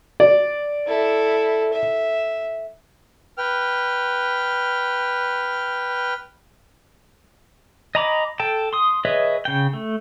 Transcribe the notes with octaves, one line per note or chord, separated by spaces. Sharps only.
D5
E4 A4
E5
B4 G5 F6
D#5 G#5 A#5 B5 D6
A4 G5 A5
C6 D#6
G#4 B4 C#5 D#5 E5
C#3 G5
A3